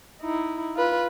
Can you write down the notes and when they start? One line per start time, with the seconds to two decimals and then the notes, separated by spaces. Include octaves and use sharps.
0.22 D#4 E4
0.76 F4 B4